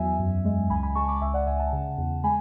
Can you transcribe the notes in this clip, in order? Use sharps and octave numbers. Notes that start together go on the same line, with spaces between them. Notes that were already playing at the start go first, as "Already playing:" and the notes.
Already playing: E2 F#3 E5 G#5
F#2
G#3
C#2 G#5 B5
G#5 B5
G#3 A5 C#6
B5 D6
C#2 E5 G#5
D5 F#5
C#2 E5 G#5
F#5 A5
C#3
E2
G#3 G#5 B5